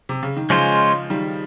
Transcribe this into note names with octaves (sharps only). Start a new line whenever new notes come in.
C3
C#3
D#3
C#3 F3 G#3 C#4 F4 C5
D#3 G3